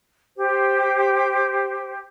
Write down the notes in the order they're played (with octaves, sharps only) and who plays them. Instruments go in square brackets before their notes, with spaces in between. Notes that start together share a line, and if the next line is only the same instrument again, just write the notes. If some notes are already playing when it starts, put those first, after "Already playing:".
[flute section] G4 C5